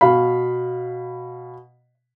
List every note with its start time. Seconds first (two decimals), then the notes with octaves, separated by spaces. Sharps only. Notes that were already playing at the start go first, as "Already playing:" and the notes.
0.01 B2 F5 B5